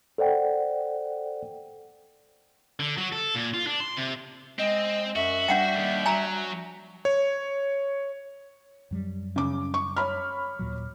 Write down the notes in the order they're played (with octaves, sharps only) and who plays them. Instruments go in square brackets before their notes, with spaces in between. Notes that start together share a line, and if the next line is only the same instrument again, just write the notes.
[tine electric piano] A4 C5 D5 F#5 G5
[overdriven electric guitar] D3
F#3
A4
A#2
F4
D4
C6
C3
[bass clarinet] G#3 [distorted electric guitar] C4 [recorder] D#5
[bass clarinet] F#2 [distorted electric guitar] F#4 [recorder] E5
[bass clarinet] G3 [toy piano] D4 F#5 G5
[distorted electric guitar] D#2 G#2
[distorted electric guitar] F#3 [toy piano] G#5 A#5
[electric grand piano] C#5
[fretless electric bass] F#2 F#3 G3
[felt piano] C#3 D6
C#6
C#5 B5 F6
[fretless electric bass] D#2 A#2 F#3